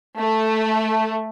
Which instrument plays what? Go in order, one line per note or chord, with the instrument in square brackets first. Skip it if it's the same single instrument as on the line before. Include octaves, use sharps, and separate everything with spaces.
[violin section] A3